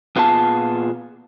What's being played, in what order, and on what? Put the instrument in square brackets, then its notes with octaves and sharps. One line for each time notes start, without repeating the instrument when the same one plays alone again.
[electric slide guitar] A#2 B3 F4 G#4 A#4 A5